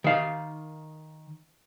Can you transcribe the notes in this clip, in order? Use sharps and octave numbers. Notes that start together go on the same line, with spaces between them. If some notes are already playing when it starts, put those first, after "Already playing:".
D#3 F5